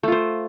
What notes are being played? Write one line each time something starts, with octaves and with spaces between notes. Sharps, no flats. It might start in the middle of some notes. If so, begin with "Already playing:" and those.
A3 F4 C5